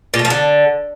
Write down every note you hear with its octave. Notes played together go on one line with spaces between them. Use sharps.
A#2
A3
F3
D3